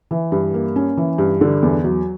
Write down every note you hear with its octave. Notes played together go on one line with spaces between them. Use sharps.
E3
G2
A#3
C#4
E3
G2
D3
E2
F#3